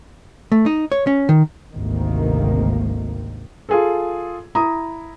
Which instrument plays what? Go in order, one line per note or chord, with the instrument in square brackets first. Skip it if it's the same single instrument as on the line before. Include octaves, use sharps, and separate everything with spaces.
[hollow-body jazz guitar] A3
D#4
C#5
C#4
D#3
[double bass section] G#1 D2 C3 D#3 A#3
[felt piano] F4 G#4 A4
E4 A#5 D#6